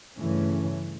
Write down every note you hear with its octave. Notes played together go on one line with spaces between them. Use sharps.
G2 C#3 E3 A3 C#4